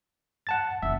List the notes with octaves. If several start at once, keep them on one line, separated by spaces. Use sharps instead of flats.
F#5 A5 A6
F1 E5